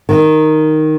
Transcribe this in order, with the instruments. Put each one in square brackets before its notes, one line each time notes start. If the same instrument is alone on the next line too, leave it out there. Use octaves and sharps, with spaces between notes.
[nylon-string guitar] D#3